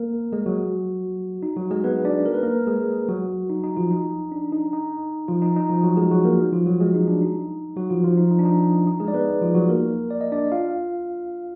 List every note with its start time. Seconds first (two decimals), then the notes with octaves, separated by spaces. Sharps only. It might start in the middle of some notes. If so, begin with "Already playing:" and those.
Already playing: A#3 A#4
0.33 G#3 G#4
0.46 F#3 F#4
1.43 D#4
1.57 F#3 F#4
1.71 G#3 G#4
1.84 B3 B4
2.05 D4 D5
2.26 A#4
2.34 B4
2.43 A#3 A#4
2.67 G#3 G#4
3.08 F#3 F#4
3.50 D#4
3.63 D#4
3.77 F3 F4
3.91 D#4
4.32 D4
4.52 D#4
4.73 D#4
5.28 F3 F4
5.42 D#4
5.56 D#4
5.70 F3 F4
5.84 F#3 F#4
5.97 G#3 G#4
6.11 F#3 F#4
6.24 A#3 A#4
6.52 F3 F4
6.66 F#3 F#4
6.80 G#3 G#4
6.94 D#4
7.08 D4
7.22 D#4
7.76 F#3 F#4
7.90 F3 F4
8.04 F3 F4
8.18 D#4
8.31 D#4
8.39 D4
8.45 D#4
8.87 D#4
9.00 G#3 G#4
9.08 D5
9.14 B3 B4
9.42 F3 F4
9.55 F#3 F#4
9.69 A#3 A#4
10.10 D5
10.21 D#5
10.32 D4 D5
10.52 F4 F5